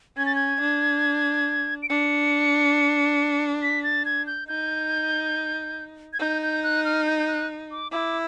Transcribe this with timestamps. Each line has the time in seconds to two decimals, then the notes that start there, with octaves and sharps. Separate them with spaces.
0.17 C#4 G#6
0.26 A6
0.35 G#6
0.60 D4
1.83 D7
1.89 D4 C#7
3.62 B6
3.84 A6
4.05 G#6
4.27 G6
4.48 D#4 G6
6.13 G#6
6.19 D#4 G6
6.42 G6
6.64 F#6
6.85 F6
7.06 G6
7.19 G6
7.28 F#6
7.71 D6
7.92 E4 D6